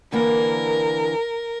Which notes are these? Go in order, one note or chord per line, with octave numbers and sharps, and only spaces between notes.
D3 E3 A#3 A#4